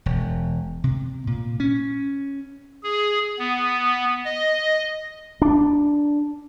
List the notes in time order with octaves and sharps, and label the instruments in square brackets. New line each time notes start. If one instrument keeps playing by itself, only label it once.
[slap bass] E1
C3
A#2
C#4
[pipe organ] G#4
B3
D#5
[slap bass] D4